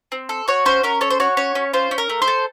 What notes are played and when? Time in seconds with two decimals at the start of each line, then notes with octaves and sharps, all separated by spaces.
0.12 C4
0.29 A4
0.48 F#4 C#5
0.65 C#4 C5
0.83 C#4 A#4
1.01 A4 C#5
1.10 C5
1.20 F#4 C#5
1.37 C#4 C#5
1.55 C#4
1.73 F4 C5
1.91 C#4
1.98 A#4
2.09 A3
2.22 C5
2.28 A4